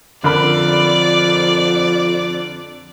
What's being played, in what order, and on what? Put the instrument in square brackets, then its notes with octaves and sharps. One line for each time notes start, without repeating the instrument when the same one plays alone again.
[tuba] F2 [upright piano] D3 A#4 B5 [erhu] D5